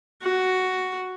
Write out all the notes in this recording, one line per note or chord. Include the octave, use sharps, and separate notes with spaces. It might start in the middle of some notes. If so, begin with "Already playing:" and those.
F#4